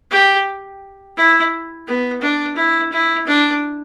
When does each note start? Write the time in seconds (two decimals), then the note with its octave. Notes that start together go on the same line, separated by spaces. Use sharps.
0.11 G4
1.17 E4
1.87 B3
2.22 D4
2.56 E4
2.92 E4
3.27 D4